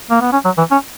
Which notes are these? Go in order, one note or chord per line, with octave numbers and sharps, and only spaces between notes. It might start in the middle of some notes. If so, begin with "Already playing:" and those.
A#3
B3
C#4
F#3
E3
C#4